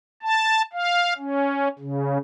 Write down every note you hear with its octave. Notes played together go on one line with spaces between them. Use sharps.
A5
F5
C#4
C#3